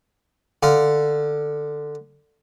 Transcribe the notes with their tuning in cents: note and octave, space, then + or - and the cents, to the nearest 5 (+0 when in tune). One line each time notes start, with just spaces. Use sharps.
D3 +10 F5 +0